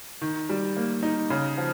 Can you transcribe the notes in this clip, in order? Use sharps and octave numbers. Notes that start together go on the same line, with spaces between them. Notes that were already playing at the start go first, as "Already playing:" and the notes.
D#3
G3
A#3
D#4
C#3
F3